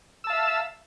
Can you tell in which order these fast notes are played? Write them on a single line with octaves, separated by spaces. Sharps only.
E6 A5 F5 E5